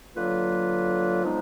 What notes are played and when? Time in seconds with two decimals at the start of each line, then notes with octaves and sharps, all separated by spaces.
0.16 D3 F#3 A#3 F4 B4
1.23 F3 G#3 B3 D#4